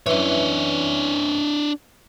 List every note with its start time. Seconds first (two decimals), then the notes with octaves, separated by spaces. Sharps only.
0.06 F#2 E3 D4 C#5